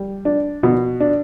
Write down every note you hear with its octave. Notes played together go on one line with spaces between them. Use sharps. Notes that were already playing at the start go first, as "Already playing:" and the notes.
Already playing: G3
D4
B2
D4